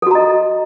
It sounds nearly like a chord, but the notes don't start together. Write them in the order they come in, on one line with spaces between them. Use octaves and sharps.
A4 F#4 A#5 D#5